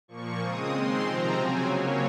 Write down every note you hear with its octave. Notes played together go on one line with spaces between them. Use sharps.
A#2 F3 A#3 C#6
C#3 G#3 C4 D#6
D#3 G#3 C4 C6
C3 F3 C4 A#5
C#3 F#3 C4 G#5
C#3 F#3 A#3 C#5